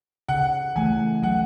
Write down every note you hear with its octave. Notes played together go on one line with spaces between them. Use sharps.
C#3 F#5
E3 A3 G#5
F#3 F#5